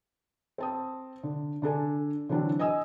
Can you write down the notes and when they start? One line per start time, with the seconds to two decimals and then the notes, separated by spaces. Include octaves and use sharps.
0.58 C4 A5 D#6
1.23 D3
1.62 D3 D4 A4 G#5
2.29 D3 E3 F#3 C4 D4
2.59 D#5 G#5 D#6 E6